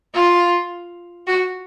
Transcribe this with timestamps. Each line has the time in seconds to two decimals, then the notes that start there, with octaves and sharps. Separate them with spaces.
0.14 F4
1.27 F#4